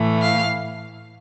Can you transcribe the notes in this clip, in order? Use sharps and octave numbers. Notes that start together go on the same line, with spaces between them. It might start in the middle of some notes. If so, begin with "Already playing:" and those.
Already playing: A2 E3 A3
F5